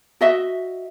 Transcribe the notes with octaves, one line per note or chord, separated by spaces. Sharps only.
F#4 D#5 E5